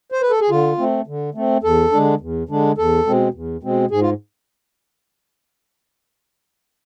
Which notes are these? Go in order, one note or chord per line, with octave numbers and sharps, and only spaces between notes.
C5
B4
A4
G#4
D3 F4
A3 C4
D3
A3 C4
E2 A4
D3 G#3 D4
E2
D3 G#3 D4
E2 A4
B2 G#3 C4
E2
B2 G#3 C4
G#2 G#4
F4